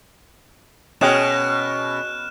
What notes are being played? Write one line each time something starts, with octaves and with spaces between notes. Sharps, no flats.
B2 C#4 G#4 G5 F6 F#6 E7